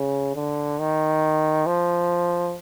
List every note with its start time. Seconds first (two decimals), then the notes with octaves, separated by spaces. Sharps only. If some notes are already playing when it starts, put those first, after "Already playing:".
Already playing: C#3
0.35 D3
0.79 D#3
1.66 F3